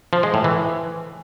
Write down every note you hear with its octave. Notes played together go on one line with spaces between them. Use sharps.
F3
G#3
A2
E3